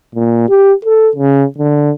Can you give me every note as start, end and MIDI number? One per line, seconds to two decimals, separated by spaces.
0.15 0.45 46
0.49 0.73 67
0.85 1.10 69
1.16 1.45 49
1.58 1.91 50